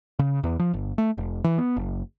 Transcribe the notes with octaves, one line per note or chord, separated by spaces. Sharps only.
C#3
E2
F3
G1
A3
F1
E3
B3
F#1